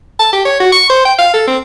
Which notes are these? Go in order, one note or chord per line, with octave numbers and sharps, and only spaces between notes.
A5
G4
C#5
F#4
C#6
C5
G5
F5
A4
C4